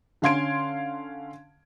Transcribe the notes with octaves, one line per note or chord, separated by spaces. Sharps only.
D3 C#4 F5 C6 G#6 D7